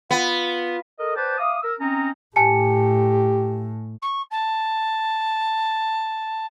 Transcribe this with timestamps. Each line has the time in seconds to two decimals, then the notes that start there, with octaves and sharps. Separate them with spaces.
0.11 B3 F4
1.00 A4 A#4 D#5
1.16 B4 C5 D5 G5 A5
1.38 E5 F5 D6 D#6
1.63 A#4 E6
1.80 C4 C#4 D#4 A#5
2.36 A2 G4 G#5 A5 C#7
4.02 C#6
4.31 A5